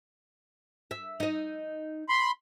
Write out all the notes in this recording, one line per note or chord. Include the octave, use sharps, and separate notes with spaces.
E5
D#4 D#5
B5 C6